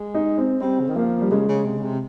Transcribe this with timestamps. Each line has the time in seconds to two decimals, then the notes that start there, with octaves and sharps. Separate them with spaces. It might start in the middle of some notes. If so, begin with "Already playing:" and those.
Already playing: G#3
0.14 D#4
0.38 C4
0.61 G3 C4
0.80 C#3
0.89 D#3
0.95 F3 A#3
1.21 G3
1.31 C#3 G#3
1.49 C#3
1.65 C3
1.77 C#3
1.83 C3